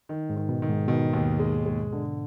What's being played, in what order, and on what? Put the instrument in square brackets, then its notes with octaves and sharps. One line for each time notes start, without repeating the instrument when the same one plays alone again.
[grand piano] D#3
[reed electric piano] G#2
[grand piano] D#3
[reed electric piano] B2
[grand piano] D#3
[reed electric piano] G#2
[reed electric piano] B2 [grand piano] D#3
[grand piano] D#2
G#3
G#3
D3